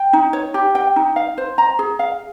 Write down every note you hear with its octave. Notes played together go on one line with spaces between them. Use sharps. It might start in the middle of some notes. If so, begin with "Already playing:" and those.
Already playing: G5
D#4
C#5
G4
G5
D#4
F5
C5
A#5
G#4
F5